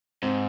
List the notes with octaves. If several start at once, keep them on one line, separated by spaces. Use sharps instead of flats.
G#2 C4